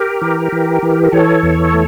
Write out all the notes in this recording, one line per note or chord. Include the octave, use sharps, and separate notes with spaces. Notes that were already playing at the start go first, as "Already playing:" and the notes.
Already playing: G4 A#4
E3
E3
E3
A#4
E3 A4 C#5
E2
A3